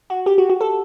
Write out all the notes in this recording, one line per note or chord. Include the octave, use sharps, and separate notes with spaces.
F#4
G4
F#4
F#4
A4